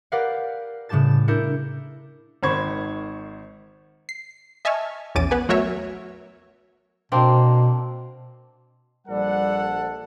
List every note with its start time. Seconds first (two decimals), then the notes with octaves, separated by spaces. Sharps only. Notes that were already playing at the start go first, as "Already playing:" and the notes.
0.12 G4 A#4 B4 D5 F5 F#5
0.89 A2 C#3 G3 G4 A5 A6
1.28 D4 E4 A#4 G6 C#7
2.43 G#1 D#3 C5 B5 C#6 G#6
4.09 C7
4.65 D#5 E5 G#5 A5 C#6 F6
5.15 A#1 E2 C#4 D6 A6 D#7
5.31 B3 B4 G#5
5.49 F#3 A3 F#4 A#4 C#5 E5
7.12 B2 A#3 C4 D4
9.07 A#1 G3 A4 F#5